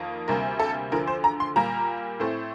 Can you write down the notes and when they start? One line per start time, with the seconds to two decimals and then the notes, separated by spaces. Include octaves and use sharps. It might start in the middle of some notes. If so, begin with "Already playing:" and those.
Already playing: F2 D#3 A#3
0.28 D2 C3 G3 A#3 A#4
0.60 A4
0.92 D2 D3 F3 A#4
1.07 C5
1.24 A#5
1.40 C6
1.56 A#2 G3 A#3 A#5
2.20 A2 A3 C4